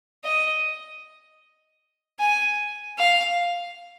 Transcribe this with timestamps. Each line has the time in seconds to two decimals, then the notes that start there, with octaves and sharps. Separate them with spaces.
0.25 D#5
2.19 G#5
2.98 F5